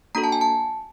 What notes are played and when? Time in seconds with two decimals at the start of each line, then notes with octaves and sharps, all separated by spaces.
0.15 A#3 D4 F#4 A4 A#5
0.24 A5
0.32 G#5
0.41 A5